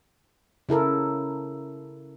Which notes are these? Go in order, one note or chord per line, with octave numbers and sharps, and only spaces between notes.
C#3 E4 A4 A#4